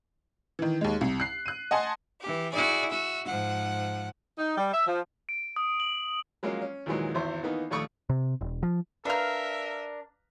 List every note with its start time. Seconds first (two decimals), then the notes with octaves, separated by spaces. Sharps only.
0.59 D#3 E3
0.81 D#2 G#3
1.01 C2
1.20 F#6 C7
1.46 F#6 D#7
1.71 D#5 F#5 G#5 A5 C6
2.21 E3 G4
2.51 E4 F#4 G#4 D5
2.90 F#4 E5
3.27 G#2 F3 F#5
4.38 D#4
4.56 G3
4.73 E5
4.87 F3
5.29 D7
5.56 D#6
5.80 F#7
6.43 F#3 G#3 A#3 C#4 F4
6.61 C#4
6.86 D#2 A#2 D#3 E3 F#3 G#3
7.14 G#1 E2 C5 E5
7.43 D#3 E3 A#3 B3 D#4
7.71 A#1 D#2 A3 C#6 D#6
8.10 C3
8.41 E1
8.63 F3
9.05 D4 A#4 B4 E5 F5 A#5 F6